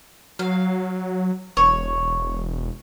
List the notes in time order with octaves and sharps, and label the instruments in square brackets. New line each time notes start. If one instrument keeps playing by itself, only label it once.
[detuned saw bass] F#3 [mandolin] F5
[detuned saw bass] E1 [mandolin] C#5